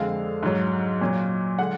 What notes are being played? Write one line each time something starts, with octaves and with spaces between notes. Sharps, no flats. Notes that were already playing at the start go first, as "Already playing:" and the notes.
Already playing: F2 D3 G#3 F5
G#2 F#3
A#2 F#3
D3 G#3 F#5